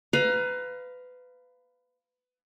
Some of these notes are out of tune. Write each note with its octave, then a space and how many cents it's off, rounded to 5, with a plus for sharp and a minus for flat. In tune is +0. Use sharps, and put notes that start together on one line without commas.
B4 +25 F5 +0 A#5 +30